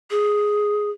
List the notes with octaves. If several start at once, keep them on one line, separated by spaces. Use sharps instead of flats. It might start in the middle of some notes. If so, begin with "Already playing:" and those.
G#4